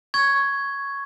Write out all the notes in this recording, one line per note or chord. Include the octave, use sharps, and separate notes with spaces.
C#6 G#6